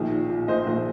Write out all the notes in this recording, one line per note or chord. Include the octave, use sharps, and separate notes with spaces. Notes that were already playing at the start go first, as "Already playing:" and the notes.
Already playing: A#1 D#3
A#2
A#2
A#1 C5 D#5
A#1